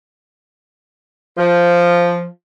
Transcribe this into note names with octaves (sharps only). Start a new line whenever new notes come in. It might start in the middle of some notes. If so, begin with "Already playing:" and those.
F3